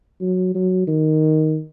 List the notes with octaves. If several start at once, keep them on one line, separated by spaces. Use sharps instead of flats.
F#3
F#3
D#3